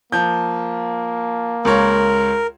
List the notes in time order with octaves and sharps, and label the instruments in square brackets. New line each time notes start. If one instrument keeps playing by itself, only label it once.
[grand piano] F3 G6 [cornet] A#3
[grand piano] C#2 C#5 [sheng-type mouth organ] A#4